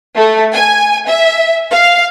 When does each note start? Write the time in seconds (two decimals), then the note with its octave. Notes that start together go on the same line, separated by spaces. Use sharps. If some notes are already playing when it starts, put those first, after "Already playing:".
0.15 A3
0.53 G#5
1.07 E5
1.71 F5